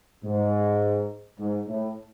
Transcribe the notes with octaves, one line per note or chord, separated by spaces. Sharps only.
G#2
G#2
A2